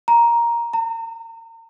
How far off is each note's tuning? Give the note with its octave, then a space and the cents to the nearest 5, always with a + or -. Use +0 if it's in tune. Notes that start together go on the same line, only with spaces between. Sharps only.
A#5 +10
A#5 -35